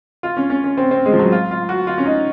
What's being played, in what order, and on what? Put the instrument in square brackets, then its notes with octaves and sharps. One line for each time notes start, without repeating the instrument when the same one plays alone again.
[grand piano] F4
C#4
C#4
C#4
C4
C4
G#3
F3
F#3
F4
F4
F#4
F4
C#4
D#4